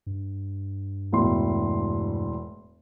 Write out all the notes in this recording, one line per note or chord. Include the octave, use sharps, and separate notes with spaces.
G2
E1 A2 C6